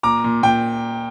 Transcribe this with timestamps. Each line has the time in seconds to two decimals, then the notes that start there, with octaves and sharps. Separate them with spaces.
0.03 A#2 A#5 D6
0.24 A#2
0.43 A#2 G5